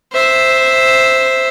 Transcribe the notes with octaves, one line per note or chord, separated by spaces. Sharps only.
C5 E5